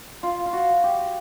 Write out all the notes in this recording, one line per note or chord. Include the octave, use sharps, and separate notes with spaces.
F4
F4
F#4
G4